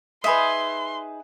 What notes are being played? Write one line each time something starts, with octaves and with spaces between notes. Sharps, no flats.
D#4 G#4 B4 D#5 E5 B5 C6